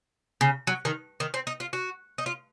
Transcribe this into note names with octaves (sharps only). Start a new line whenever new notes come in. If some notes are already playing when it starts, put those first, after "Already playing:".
C#3
F#3
D#3
D#3
C4
D#4
F4
F#4
D#4
F4